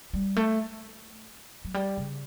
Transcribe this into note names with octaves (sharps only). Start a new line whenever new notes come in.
G3
A3
F#3
G3
C#3